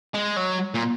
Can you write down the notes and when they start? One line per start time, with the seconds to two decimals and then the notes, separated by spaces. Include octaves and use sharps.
0.14 G#3
0.36 F#3
0.74 A#2